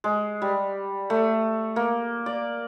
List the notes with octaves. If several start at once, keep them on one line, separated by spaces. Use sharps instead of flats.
G#3
G3
A3
A#3
D5